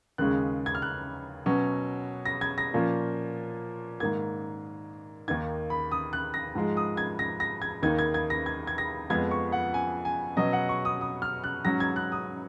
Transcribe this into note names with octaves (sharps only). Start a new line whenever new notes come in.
D#2 C#3 G#3 C#4 F#6
G#6
F6
F#6
B2 F#3 C#4
A#6
G#6
A#6
A#2 F3 A#3 C#4
G#2 D#3 A#3 G#6
D#2 D#3 A#3 D#4 G#6
B5
D#6
F#6
A#6
G#2 F3 G#3
D#6
G#6
A#6
A#6
G#6
D#2 D#3 A#3 D#4 G#6
G#6
G#6
A#6
G#6
G#6
A#6
F2 F3 G#3 B3 G#6
C#6
F#5
G#5
G#5
B2 F#3 C#4 D#5
F#5
C#6
D#6
D#6
F6
F#6
G#2 F#3 C#4 A#6
G#6
F#6
D#6